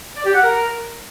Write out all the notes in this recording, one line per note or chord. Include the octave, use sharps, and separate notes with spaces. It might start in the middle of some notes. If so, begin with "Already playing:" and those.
D5
G4
F#5
A#4